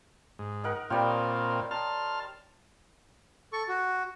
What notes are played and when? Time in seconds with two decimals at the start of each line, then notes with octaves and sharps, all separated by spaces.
0.39 G#2
0.64 D#4 A#4 F#5
0.90 A#2 G3 C4 F4 C#5 G5
1.71 A5 A#5 C6 F6
3.53 A4 C#6
3.68 F#4